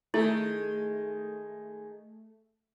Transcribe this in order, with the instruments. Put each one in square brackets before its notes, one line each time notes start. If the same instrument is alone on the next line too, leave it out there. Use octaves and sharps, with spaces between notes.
[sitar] D#3 G#3 [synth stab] A3 [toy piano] E4